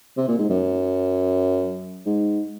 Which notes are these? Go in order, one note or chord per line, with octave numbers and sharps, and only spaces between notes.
C3
A#2
G#2
F#2
G#2